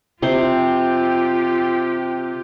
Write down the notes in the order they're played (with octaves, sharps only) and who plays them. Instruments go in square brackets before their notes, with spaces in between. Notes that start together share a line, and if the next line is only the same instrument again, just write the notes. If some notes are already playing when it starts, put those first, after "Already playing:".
[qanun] C3 C5 [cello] F4 G4